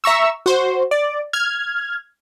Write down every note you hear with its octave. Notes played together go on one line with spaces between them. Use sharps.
E5 A#5 C#6 E6
F#4 C5
D5
F6 G#6